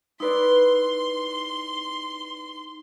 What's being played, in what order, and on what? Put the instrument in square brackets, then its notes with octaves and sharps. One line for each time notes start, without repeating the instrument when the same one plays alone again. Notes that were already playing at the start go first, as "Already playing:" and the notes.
[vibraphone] D#4 [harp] E4 B4 D5 [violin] C6